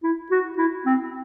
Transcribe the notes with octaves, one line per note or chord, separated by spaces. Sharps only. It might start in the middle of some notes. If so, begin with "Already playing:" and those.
E4
F#4
E4
C4